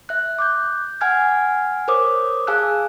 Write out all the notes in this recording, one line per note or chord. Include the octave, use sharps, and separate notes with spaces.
E5 F#6
D6 F#6 G6
F#5 G#5 F6 G#6
A#4 C5 C#5 D6 D#6
G#4 F5 G#5 A5 E6 F#6